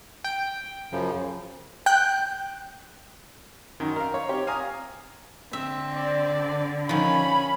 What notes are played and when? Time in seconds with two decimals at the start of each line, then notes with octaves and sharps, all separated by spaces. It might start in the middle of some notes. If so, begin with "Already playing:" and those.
0.24 G5
0.92 F#2 C#3 F3
1.86 G5 F#6 G6
3.80 F#2 D#3
3.96 A#4 F5
4.14 C#5
4.29 C4 G4 C#5
4.47 F5 G#5 A#5 D#6
5.53 D3 C4 E5
5.94 D5
6.89 D#3 F3 C#4 B5